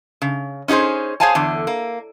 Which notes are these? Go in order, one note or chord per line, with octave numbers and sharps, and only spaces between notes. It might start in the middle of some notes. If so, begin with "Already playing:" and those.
C#3
C#4 D#4 F#4 G#4 C5
G#4 C5 C#5 F5 G#5 A5
E2 D3
A#3